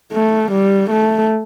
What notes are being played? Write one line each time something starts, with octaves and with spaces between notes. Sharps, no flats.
A3
G3
A3